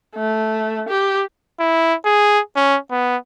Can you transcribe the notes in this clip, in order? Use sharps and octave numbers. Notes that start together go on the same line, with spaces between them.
A3
G4
E4
G#4
C#4
B3